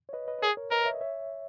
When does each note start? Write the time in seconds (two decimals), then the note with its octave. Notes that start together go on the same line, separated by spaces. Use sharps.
0.09 C#5
0.13 B4 D#5
0.28 B4 D#5
0.39 B4
0.42 G#4 A#4 C#5
0.57 A#4 C#5
0.71 A#4 B4 D#5
0.86 C#5 E5
0.94 D#5
1.01 C#5 E5